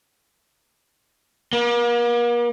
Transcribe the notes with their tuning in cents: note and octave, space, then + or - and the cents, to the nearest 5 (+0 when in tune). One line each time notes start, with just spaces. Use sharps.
A#3 +40